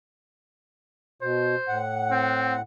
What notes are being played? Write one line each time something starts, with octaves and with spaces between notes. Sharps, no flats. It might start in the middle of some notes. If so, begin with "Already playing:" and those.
B2 C5
A2 F#5
C4